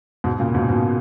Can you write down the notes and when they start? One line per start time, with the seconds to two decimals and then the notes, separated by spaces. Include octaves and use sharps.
0.24 G#2 B2
0.39 A#2 C#3
0.54 G#2 B2
0.69 G#2 B2